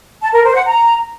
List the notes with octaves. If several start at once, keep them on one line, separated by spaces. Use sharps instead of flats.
A5
A#4
C5
F#5
A#5